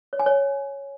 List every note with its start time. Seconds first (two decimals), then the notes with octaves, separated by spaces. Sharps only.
0.13 C#5
0.19 G#5
0.26 C#5